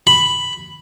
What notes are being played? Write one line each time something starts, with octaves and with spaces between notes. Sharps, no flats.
B5